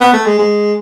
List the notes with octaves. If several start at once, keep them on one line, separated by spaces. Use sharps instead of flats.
B3
A3
G#3
G#3